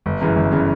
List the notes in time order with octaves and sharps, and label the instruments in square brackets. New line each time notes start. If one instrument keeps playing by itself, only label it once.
[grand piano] G1
F#2 C#3 E3
G1
C#3 E3